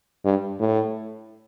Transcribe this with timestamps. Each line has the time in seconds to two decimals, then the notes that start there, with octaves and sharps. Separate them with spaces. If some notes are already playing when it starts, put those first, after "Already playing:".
0.25 G2
0.60 A2